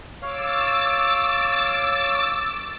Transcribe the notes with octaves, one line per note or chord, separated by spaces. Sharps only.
C#5 F5 D6 E6 A6